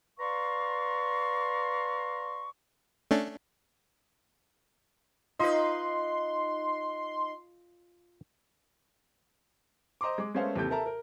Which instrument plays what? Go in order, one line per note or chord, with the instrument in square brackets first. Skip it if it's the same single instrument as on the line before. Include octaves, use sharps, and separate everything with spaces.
[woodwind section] B4 D5 F5 A#5 C6 C#6
[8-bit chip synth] A3 C#4 D4
[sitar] D#4 B4 [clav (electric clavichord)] F4 D#5 [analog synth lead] C6
[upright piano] C5 D#5 A#5 C6 D6
G#3 D6
G#3 A3 B3 C#4 C5 F5
D#2 C3 E3 G4 A4 G6
A4 A#4 E5 A5 A#5
A#4